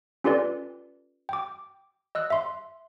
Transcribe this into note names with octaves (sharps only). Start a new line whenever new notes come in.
C#4 F4 G4 A4 B4 D5
G5 D6
D#5 E6 F#6
E5 C6